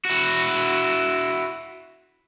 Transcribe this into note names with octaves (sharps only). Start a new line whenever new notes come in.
E4 F#4